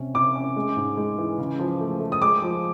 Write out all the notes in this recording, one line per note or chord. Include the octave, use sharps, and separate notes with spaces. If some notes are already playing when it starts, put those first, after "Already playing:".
Already playing: C3 C#4
C3 D6
C#4
G#3
G#2
G#3
E3
C#3
F3
A3
A3
D#6
G#3 D6
F3